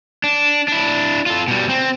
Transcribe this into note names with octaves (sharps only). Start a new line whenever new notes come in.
D4
D4 E4
F4 A4
B2 G3
C4